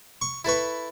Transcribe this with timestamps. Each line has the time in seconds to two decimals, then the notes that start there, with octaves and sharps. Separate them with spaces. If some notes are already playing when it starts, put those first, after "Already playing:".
0.21 C#6
0.45 E4 A4 B4 C#6